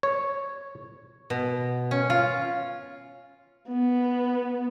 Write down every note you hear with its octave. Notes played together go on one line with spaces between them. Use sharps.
C#5
B2
C#4
F4
B3